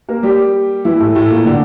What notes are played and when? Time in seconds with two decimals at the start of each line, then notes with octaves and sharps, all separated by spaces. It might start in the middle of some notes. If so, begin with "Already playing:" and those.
0.09 A#3 A#4
0.23 G3 G4
0.85 E3 E4
1.00 A2 A3
1.15 A2 A3
1.30 A#2 A#3
1.45 D3 D4